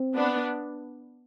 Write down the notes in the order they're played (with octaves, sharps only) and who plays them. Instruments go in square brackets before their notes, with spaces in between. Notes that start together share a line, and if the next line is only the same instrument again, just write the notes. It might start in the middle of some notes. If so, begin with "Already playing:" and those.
Already playing: [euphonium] C4
[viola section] B3 D4